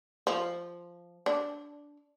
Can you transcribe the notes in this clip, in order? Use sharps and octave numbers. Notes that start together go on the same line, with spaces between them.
F3
D4